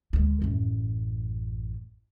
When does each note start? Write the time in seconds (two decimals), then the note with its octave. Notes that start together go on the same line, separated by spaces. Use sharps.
0.13 D2 G#3
0.42 A1 F#2